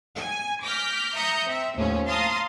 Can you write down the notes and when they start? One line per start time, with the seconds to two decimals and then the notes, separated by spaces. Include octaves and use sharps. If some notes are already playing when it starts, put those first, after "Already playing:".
0.18 G#5
0.64 D6 F6 G6 A#6 B6
1.14 E5 A#5 D#6 G6 A#6 C#7
1.47 C4 E5
1.76 D#2 A2 F3 C#4
2.08 F5 A5 A#5 C6 D#6